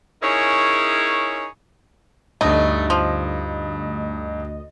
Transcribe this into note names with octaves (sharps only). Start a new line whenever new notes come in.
C#4 D#4 E4 G#4 A#4 C#5
D2 G2 A3 D#4 D#5
F3